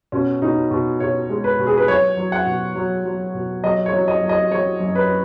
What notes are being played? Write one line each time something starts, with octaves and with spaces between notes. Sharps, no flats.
B2 C#4
B2 D#4
B2
B2 C#5
G#3
B4
B2
G#4
B4
F#3 C#5
F#3
F#5
B2
F#3
F#3
B2
F#3 D#5
C#5
F#3
D#5
F#3
D#5
F#3 C#5
F#2
B4